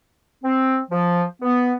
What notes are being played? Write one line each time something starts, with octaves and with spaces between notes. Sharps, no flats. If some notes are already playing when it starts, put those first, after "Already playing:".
C4
F3
B3